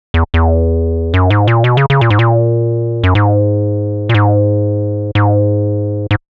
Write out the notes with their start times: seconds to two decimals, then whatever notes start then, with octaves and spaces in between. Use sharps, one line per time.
0.14 E2
0.34 E2
1.14 F#2
1.30 G#2
1.48 A#2
1.64 B2
1.77 C#3
1.90 C#3
2.01 A#2
2.10 G#2
2.19 A#2
3.04 F#2
3.15 G#2
4.09 A#2
4.15 G#2
5.15 G#2
6.11 G#2